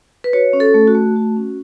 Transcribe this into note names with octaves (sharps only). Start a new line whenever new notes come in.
B4
F#4 C#5
C#4
A4
A3
F#4
A3
F#4
C#4